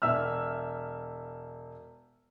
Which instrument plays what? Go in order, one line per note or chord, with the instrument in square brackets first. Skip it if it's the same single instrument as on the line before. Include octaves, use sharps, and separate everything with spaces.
[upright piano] E1 E5 E6 F6